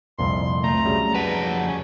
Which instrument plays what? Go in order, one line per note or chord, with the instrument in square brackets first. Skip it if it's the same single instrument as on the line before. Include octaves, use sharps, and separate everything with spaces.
[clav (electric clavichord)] C2 F2 A#2 [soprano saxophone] C6
[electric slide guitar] A3 [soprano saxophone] A#5
[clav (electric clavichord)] C#3 F#3 G3
[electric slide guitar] F2 F#5 A5 [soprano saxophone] B4
[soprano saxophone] C#4